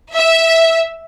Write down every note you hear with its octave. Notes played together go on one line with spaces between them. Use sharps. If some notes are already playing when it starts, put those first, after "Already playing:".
E5